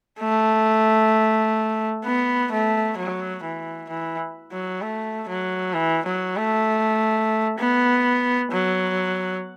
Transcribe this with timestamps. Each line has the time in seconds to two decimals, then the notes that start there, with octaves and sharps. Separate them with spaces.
0.21 A3
2.05 B3
2.52 A3
2.98 F#3
3.44 E3
3.90 E3
4.52 F#3
4.82 A3
5.29 F#3
5.74 E3
6.06 F#3
6.37 A3
7.58 B3
8.52 F#3